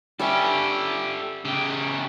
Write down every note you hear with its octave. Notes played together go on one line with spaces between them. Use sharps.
G3 C#4 G4 A4 E5
C#3 G4